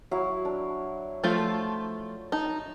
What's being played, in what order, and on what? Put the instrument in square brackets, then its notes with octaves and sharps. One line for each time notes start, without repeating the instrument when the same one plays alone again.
[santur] F#3 E4 F5
D4
[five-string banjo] F3 A3 F4
[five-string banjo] D#4 [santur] A5